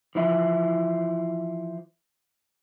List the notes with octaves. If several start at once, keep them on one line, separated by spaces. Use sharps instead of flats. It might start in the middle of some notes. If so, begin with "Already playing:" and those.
E3 F3 E4